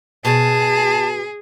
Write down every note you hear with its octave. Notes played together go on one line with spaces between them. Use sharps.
B2 G#4 A5